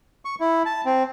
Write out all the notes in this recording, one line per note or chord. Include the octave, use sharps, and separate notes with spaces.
C#6
E4
A5
C4